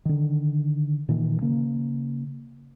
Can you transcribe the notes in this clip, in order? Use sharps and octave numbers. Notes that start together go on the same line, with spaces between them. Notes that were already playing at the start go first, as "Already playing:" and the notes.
D3 D#3
A#2 D#3 E3
C#3 A#3